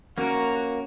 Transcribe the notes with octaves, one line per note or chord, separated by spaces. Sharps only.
A#3 C#4 F#4 A#4